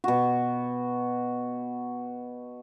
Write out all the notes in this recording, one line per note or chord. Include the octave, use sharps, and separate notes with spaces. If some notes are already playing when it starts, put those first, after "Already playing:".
B2 F#4